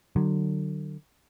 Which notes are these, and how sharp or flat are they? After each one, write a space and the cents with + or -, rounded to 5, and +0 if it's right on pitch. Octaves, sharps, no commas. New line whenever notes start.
D3 +35 F#3 +30